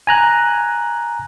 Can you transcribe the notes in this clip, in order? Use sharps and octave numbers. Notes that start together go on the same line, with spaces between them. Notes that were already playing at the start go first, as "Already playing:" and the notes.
G#5 A#5 F#6